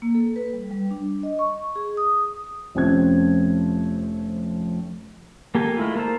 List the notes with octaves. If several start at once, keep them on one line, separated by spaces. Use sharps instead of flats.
A#3
A4
B4
G3
G3
D4
D#5
C#6
G#4
D#6
F1 F3 C4 C#4 G#6
A#3 G4 A4 G#5
G#3 A3 E4 F4
A#3 A#4 C5 A5